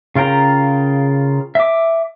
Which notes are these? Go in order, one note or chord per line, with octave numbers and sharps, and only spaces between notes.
C#3 F4 A#4 G5 A#5
E5 D6